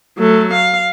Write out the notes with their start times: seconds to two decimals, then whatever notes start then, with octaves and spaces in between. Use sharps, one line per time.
0.18 F#3 A3
0.53 F5